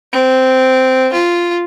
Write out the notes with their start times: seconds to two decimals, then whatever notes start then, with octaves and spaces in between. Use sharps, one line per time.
0.13 C4
1.13 F4